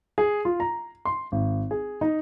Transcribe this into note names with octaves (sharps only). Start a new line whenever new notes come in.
G#4
F4
A#5
C6
G#1
G#4
D#4